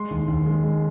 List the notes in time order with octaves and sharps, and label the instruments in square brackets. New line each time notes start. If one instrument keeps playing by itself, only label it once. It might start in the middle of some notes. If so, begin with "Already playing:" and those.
Already playing: [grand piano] G#3 C6
D#2
D#2
G#3
G#3